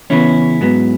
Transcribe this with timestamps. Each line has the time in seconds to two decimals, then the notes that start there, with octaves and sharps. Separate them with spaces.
0.10 E2 C#3 E3 B3 C#4 E4
0.61 G#2 F#3 B3